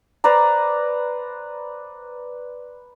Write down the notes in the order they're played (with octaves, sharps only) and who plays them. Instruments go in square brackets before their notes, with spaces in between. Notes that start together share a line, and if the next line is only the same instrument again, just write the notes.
[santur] B4 C5 D5 A#5